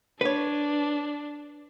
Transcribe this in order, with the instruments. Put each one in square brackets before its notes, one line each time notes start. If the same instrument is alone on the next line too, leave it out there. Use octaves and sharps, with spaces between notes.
[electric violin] D4 [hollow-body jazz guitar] B4 C#5